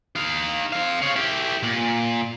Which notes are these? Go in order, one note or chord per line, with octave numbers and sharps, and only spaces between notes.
D#4 F5
C4 F5
C#5 F5
E4 G4
A#2